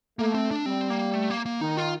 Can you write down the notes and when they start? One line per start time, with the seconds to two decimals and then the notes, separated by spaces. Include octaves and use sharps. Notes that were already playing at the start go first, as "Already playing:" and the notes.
0.19 A3 A#3
0.35 C4
0.51 D4
0.66 G3 C4
0.90 A#3
1.14 A3
1.30 A#3
1.46 A#3
1.61 D#3 D#4
1.77 F4